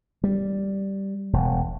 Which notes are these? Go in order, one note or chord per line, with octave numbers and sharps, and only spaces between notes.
G3
E1